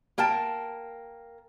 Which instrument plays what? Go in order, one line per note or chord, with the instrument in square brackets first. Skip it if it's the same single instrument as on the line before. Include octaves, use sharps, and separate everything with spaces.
[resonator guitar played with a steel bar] A#3 A#4 G5 A5